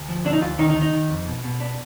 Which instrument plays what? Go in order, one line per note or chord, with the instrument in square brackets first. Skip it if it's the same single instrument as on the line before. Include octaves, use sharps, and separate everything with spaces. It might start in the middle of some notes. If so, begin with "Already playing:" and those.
Already playing: [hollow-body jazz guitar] D2
F3
D3 D4
D#4
D2 F4
D#3 D#4
D#4
D#3
D#4
D#3
F2
B2
B2
B3 D4